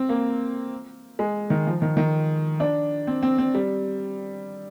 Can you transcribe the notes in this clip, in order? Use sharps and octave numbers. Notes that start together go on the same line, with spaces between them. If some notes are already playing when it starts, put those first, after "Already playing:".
Already playing: C4
A#3
G#3
D#3
F3
D#3
D#3
D4
C4
C4
C4
G3